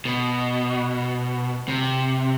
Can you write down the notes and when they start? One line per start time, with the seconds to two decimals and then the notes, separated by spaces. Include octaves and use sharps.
0.05 B2
1.68 C3